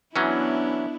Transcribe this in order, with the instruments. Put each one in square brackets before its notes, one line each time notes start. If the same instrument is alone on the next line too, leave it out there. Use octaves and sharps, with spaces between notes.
[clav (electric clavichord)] E3 F#3 C#4 [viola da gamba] B3 D4 E4